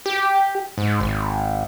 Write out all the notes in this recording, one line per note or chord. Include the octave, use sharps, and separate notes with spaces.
G4
G#2
G#1